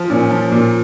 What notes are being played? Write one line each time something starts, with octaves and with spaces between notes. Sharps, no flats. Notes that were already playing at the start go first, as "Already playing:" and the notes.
Already playing: F3
A#2 C#4
F3
A#2